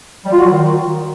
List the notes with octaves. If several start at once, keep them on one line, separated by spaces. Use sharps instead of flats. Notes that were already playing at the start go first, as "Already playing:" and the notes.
G3
F4
F#4
F#3
D#3